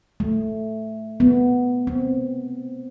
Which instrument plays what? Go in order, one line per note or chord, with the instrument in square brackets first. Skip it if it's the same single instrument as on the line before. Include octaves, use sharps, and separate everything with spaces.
[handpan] A3
B3
C4